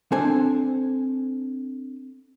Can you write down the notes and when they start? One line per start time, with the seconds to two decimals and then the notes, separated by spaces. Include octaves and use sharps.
0.12 C4 D4 A4 C5 G#5